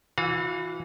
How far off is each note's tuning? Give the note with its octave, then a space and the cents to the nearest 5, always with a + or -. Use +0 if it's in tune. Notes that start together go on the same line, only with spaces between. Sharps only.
E3 +0 F#4 -35 F5 +20